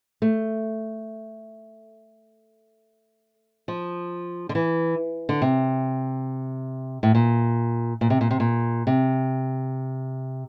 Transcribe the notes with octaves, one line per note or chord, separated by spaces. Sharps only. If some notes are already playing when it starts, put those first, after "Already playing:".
A3
F3
D3
E3
D3
C3
A2
A#2
A#2
C3
A#2
C3
A#2
C3